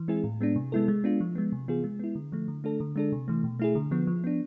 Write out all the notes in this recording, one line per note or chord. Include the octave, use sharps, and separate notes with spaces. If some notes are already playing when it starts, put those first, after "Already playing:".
Already playing: E3
G#3 C4 E4 G#4
A2
G#3 B3 D4
C3
G#3 B3 E4 A4
G#3
B3 D4 F4
F3
G#3 B3
C3
E3 B3 F4 G#4
G#3
B3 E4
D3
F3 A3
D3
A3 D4 A4
D3
G#3 D4 A4
C3
E3 A3
B2
A3 E4 G#4
D3
F3 B3
F3
B3 D4